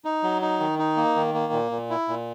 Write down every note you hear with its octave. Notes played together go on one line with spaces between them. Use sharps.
D#4
F#3
D#4
D#3
D#4
A#3
D#3
A#3
A#2
A#2
E4
A#2